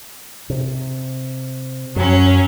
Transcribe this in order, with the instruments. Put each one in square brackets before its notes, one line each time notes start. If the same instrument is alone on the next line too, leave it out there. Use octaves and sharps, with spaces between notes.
[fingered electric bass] C3
[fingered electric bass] F#2 [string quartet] F#3 C#4